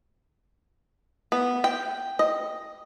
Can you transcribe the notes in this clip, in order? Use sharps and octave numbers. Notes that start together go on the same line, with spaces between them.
B3
G5
D#5